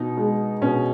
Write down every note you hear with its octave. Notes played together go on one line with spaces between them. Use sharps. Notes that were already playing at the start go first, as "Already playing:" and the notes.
Already playing: B2 D#4
G#3
B2 C#4